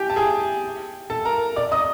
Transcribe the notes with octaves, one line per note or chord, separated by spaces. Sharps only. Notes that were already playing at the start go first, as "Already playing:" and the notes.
Already playing: G4 G5 G#5
A5
G#4 G#5
A4 A5
A#4 A#5
D5 D6
D#5 D#6